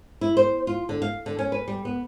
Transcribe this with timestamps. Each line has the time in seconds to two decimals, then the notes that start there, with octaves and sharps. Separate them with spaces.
0.21 E4
0.37 C5
0.67 F4
0.89 D3
1.02 F5
1.26 D3
1.39 C#4
1.52 B4
1.68 G3
1.85 B3